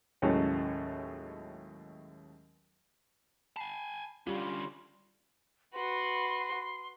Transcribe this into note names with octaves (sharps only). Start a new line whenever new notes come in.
D#2 A2 C#3 F#3 G#3 A3
G#5 A5 B5 C7
D3 G3 C#4 F4 G4 F5 B5
F#4 B4 C6